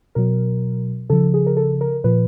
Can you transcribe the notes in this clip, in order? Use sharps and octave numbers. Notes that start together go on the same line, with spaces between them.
B2 F#3 A#4
C#3 F3 A4
G#4
A#4
A4
A#4
A#2 F3 B4